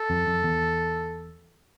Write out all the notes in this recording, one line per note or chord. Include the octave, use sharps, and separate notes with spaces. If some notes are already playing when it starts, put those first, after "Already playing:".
Already playing: A4
F2
F2
E2